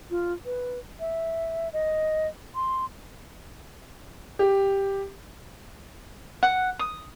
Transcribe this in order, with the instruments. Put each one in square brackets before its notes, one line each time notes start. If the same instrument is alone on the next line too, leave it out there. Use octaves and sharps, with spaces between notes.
[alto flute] F4
B4
E5
D#5
C6
[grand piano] G4
[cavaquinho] F#5
D#6